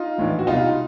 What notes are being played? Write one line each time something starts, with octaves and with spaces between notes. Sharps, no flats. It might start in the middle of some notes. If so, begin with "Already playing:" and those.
Already playing: D#4 F4
A#1 A2 E3
F#4
C2 B2 D#4 F4